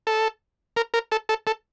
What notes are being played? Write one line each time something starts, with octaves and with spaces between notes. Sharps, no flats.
A4
A#4
A#4
A4
A4
A4